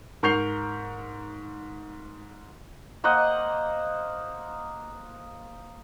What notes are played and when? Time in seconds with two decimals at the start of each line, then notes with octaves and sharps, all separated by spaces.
0.23 G#2 A#4 C#6 G6 C7 F7
3.04 A#3 C5 D#5 F#5